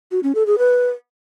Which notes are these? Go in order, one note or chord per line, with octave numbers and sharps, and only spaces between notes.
F#4
C#4
A4
G#4
B4